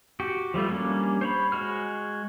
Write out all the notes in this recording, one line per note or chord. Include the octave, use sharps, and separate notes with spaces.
F#4 G4
F3 G3 A3 F4
G3 A#3 C#4 D4
C5 C#5 B5
G#3 F#4 F6